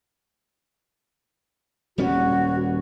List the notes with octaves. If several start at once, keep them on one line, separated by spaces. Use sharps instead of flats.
D#1 G3 C#4 F#4